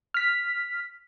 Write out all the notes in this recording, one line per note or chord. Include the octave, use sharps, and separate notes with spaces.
F6 B6